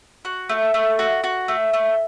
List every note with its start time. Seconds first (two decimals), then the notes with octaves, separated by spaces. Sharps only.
0.25 F#4
0.49 A3
0.74 A3
0.99 F#4
1.24 F#4
1.48 A3
1.73 A3